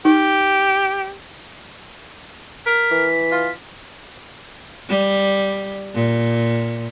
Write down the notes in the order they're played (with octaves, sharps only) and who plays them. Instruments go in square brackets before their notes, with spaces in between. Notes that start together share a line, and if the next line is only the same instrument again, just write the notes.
[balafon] D#4 [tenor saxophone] G4
[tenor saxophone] A#4 [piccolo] B6
[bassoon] E3
[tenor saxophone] F4
[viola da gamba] G3
A#2